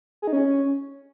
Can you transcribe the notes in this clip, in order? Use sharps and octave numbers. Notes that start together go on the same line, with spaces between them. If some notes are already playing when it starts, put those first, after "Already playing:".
G#4
D#4
C#4